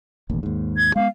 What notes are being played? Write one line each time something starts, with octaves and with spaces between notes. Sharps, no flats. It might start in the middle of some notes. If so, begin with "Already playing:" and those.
E1 A1 D#2
D#2 G#2
G#6
G#3 A3 B3 F5